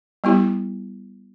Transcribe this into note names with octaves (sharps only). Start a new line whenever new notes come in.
G3 B3 E4 G4